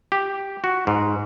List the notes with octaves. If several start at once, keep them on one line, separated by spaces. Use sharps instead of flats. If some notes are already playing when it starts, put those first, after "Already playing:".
G4
F#4
G#2